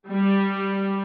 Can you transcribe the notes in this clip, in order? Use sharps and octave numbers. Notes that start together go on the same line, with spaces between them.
G3